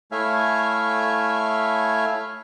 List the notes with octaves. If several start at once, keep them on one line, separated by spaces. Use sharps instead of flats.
A3 E4 C#5 E5 F5 G#5